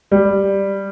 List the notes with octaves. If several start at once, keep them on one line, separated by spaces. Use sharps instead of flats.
G3